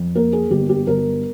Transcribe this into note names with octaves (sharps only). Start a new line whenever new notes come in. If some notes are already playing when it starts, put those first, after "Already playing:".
Already playing: F2
A#3 A#4
G#4
G1 G4
G4
G1 A#4